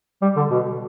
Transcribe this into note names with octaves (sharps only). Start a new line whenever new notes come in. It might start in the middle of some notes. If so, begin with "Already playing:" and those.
G3
D3
B2